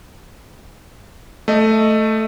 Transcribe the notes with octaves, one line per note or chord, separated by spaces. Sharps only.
A3 D#5